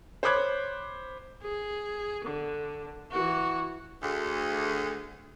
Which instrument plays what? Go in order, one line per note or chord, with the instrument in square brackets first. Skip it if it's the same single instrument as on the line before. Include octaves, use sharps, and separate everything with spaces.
[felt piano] C5 C#5 B5 D6 F#6 G#6
[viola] G#4
D3
E3 F#4
[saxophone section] D2 G#4